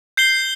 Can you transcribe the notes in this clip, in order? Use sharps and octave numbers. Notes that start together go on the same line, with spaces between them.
G6 C7 G7